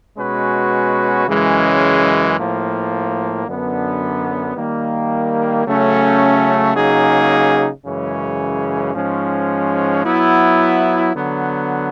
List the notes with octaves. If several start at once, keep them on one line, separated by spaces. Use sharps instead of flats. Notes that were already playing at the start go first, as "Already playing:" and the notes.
B2 G#3 C#4 F#4 B4
F#2 C#3 E3 G#3 C#4
A2 F3 A#3
F#2 D3 F#3 B3 D4
D#3 G3 A#3
C#3 F#3 A3 C#4
C#3 F#3 A#3 D#4 G#4
F#2 C#3 E3 G#3 C#4
G#2 F3 G#3 C#4
F#3 B3 E4
D3 F#3 B3